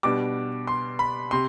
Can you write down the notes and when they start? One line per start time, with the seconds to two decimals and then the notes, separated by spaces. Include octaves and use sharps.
0.03 B2 G3 D4 D6
0.67 C6
0.99 B5
1.31 C3 C6